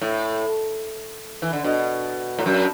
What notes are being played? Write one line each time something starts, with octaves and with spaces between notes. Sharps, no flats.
A2
E3
D3
B2
A2
F#2